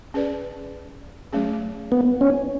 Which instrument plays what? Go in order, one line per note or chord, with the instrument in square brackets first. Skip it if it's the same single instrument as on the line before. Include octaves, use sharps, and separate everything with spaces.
[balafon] C#4 G#4 B4 D5
F#3 A3 C#4 G#4
[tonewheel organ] B3
C#4